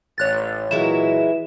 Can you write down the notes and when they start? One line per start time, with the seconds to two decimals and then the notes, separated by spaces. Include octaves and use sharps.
0.18 A1 C#5 F#6 A6
0.71 A#2 E3 F#3 G#3 E4 E7